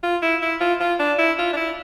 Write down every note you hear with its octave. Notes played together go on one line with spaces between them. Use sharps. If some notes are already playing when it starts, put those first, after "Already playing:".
F4
E4
E4
F4
F4
D4
E4
F4
D4
E4